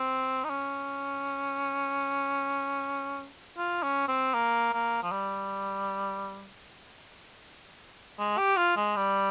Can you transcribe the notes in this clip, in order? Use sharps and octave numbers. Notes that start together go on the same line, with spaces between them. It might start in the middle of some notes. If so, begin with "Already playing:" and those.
Already playing: C4
D#4
C#4
F4
C#4
C4
A#3
A#3
F3
G3
G#3
G4
F4
G#3
G3